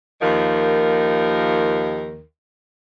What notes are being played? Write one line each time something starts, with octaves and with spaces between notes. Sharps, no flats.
D#2 D#3 F3 A#4